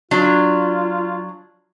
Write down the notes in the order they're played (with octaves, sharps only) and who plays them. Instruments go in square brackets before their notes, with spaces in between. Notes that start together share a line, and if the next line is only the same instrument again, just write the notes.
[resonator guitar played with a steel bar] F#3 D4 [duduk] F4